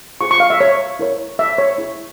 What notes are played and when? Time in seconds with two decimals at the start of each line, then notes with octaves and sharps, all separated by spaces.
0.21 F4 G#4 C5 C#6
0.31 C#6
0.40 F5
0.50 E5
0.61 C#5
0.99 E4 A#4 C#5
1.39 E5
1.58 C#5
1.78 E4 G#4 C#5